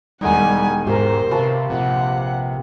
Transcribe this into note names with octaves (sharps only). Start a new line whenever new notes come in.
E1 D#3 G3 D#4 F#5 G#5
G#2 G4 A#4 C5
C3 B4 F5 A5 C#6
A#1 C3 F#5